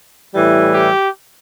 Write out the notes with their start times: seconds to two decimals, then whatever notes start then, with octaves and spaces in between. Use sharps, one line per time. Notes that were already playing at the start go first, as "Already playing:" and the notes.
0.34 A2 E3 G3
0.73 G4